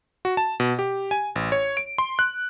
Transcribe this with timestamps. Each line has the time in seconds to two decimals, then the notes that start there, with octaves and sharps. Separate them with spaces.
0.25 F#4
0.37 A5
0.60 B2
0.79 G4
1.11 G#5
1.36 A1
1.52 C#5
1.77 D7
1.98 C6
2.19 F#6